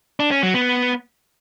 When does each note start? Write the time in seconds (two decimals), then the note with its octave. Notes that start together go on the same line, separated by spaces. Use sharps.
0.20 D4
0.31 C#4
0.43 F#3
0.54 B3